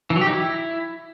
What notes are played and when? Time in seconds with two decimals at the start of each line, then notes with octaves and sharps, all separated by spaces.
0.10 E3
0.16 F#3
0.21 G4
0.27 D#4
0.32 E4